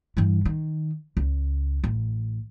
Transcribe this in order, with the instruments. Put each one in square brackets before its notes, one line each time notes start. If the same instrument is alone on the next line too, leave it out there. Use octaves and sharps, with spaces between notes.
[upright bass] G2 E3
D#3
C#2
A1